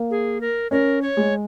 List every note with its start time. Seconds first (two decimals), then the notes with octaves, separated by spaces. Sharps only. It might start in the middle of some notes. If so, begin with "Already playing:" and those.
Already playing: A#3
0.11 G#4
0.41 A#4
0.71 C#4 A#4
1.02 C#5
1.17 G#3